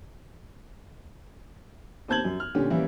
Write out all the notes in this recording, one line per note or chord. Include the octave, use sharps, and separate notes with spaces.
D#2 C4 A5 G6 G#6 F#7
F#2
F6
A#2 D3 C#4 G4
E3 G3 A#3 C#4 E4 A#4